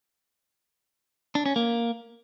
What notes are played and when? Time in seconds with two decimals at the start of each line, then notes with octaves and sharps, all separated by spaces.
1.35 D4
1.46 C#4
1.56 A#3